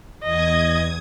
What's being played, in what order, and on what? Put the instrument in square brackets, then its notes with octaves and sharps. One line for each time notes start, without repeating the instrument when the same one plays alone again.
[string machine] E2 D#6 G#6 [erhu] D#5